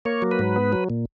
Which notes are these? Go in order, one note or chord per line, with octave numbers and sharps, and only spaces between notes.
A#3 C#5
F#3
B4
G#2
B3
F#3
A#2